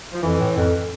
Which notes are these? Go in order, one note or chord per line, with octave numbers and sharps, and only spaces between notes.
F3
F2 E3
A2
F2